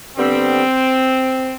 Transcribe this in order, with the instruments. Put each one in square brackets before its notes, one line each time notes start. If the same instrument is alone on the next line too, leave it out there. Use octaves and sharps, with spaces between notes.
[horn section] D3 G3 B3 C4